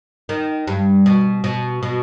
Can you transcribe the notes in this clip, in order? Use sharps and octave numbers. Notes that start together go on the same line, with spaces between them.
D#3
G2
B2
B2
B2